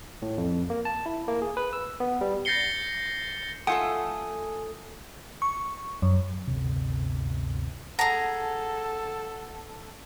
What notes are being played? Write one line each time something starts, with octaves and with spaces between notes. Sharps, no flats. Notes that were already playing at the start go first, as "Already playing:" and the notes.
A2
F2
A#3
A5
E4
A#3
G#4
B4
E6
B3
G3
G6 A6 A#6 C7 C#7 G7
A3 F4 A4 F#5 G#5 D#6
C#6
F#2
G1 D2 C3
G#4 A4 F#5 A5 A#5